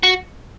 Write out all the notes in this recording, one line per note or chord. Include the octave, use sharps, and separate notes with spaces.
F#4